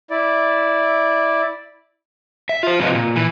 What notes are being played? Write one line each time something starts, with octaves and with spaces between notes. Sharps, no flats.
E4 D5
E5
F4 C5
G2 C3 F3 F4 B4 D#5
A#2
E3